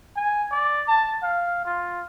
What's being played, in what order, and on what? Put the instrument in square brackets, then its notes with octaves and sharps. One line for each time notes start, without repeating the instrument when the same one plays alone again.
[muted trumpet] G#5
D5
A5
F5
F4